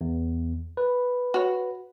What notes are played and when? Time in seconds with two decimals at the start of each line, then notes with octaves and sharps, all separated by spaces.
0.01 E2
0.77 B4
1.34 F#4 C#5